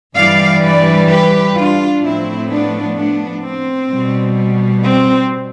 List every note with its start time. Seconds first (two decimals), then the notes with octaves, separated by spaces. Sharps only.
0.15 G2 E3 G3 D5 F5
0.62 B4 D5
1.09 G4 B4
1.56 D4 F4
2.02 A2 F3 A3 C4 E4
2.50 B3 D4
2.96 B3 D4
3.44 C4
3.90 B2 G3
4.84 C4